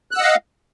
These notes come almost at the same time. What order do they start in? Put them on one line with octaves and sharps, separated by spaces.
F#6 E6 F#5 D#5 F5